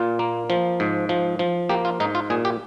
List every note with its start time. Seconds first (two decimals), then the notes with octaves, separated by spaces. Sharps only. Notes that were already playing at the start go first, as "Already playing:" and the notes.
Already playing: A#2 F4
0.19 A#3
0.50 F3
0.80 G#2
1.09 F3
1.39 F3
1.69 A#3 G4
1.85 F4
2.00 G#2 D#4
2.15 F4
2.30 A#2 G#4
2.45 G4